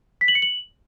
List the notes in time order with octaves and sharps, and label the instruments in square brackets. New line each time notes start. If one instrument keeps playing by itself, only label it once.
[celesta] B6
F#7
C#7
F#7